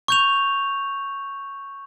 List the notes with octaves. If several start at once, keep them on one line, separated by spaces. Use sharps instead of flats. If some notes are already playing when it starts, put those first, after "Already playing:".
C#6 G6 F7